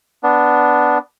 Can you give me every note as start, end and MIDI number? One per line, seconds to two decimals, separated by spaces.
0.23 0.98 59
0.23 0.98 62